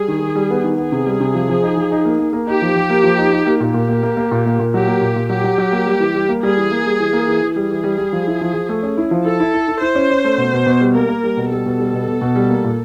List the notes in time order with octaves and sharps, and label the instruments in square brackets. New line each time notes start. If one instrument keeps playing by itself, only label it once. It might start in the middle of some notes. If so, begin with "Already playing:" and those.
Already playing: [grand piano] G3 [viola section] G#4
[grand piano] D#3
D#3
G3
B3
D#3
[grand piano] B3 [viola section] G#4
[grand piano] C3
G3
C3
F3
F3
D#4
F3
D#4
A#3
A#3
A#3
[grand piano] D#4 [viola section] G4
[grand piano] F3
F3
A#3
F3
D#4
D#4
A#3
[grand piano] A#2 [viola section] G4
[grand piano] A#2
A#3
A#3
A#3
A#2
A#3
A#2
[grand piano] F#3 [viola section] G4
[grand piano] A#3
A#2
A#2
[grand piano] F#3 [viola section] G4
[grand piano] F#3
F#3
A#3
G3
E3
G3
A#3
[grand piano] G3 [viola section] G#4
[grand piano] E3
A#3
G3
E3
A#3
E3
E3
[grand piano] G3 [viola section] G#4
[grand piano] E3
G3
G3
F3
E4
F3
F3
A3
C#4
E4
F3
[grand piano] E4 [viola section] A4
[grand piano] E4
E4
E4
[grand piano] E4 [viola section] C5
[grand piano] C#4
C#4
A3
B2
B2
B2
G3
[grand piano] A#3 [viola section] A#4
[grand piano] A#3
G3
B2
[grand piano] G3 [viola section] A4
[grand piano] B2
G3
B2
B2
B2
G3
A#3
A#2